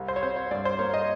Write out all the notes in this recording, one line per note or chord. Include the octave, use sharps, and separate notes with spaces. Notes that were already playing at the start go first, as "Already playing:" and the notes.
Already playing: C2
C5
C#5
C4 C5
C#5
G2 D5
C5
A#3 C#5
D#5